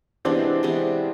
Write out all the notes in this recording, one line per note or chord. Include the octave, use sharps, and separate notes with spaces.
C3 E3 G#3 B3 C4 D4
C3 E3 G#3 B3